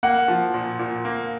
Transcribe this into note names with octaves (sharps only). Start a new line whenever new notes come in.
A#3 F#5
F3
A#2
A#2
A#3